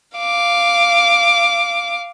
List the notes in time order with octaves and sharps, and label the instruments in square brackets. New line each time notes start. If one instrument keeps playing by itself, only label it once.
[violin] F5 D6